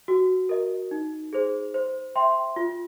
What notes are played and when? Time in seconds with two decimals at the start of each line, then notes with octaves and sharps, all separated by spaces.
0.08 F#4
0.49 A#4 D#5
0.91 D#4
1.33 G#4 C5
1.74 C5
2.15 E5 G5 C6
2.56 F4